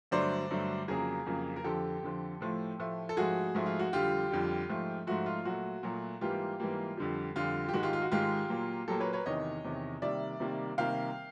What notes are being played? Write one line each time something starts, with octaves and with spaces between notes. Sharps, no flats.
G2 D3 F#3 A3 C5 D5
G2 D3 F#3 A3
F2 C#3 F#3 A#3 G#4 A#4
F2 C#3 F#3 A#3
A#4
F2 D3 F3 G4 A4
F2 D3 F3
A2 F3 A3
A2 F3 A3
A4
G#2 F3 A3 F#4 G#4
G#2 F3 A3
F4
F#4
F2 D3 G3 F4 G4
F2 D3 G3
G#2 F3 A3
G#2 F3 A3 F#4
F4
A#2 F#3 A3 F#4
A#2 F#3 A3
G#2 E3 G3 A#3 F4 G4
G#2 E3 G3 A#3
F2 D3 G3
F2 D3 G3 F4
G4
G#2 D#3 G#3 F#4
F4 G4
F4
F#4
G#2 D#3 G#3 F4 G4
A#2 F#3 A#3
A#2 F#3 A#3 G4 A4
B4 C#5
B4 C#5
E2 C3 D#3 C#5 D#5
E2 C3 D#3
C3 D#3 G3 A#3 D5 E5
C3 D#3 G3 A#3
C3 D#3 G3 A#3 F5 G5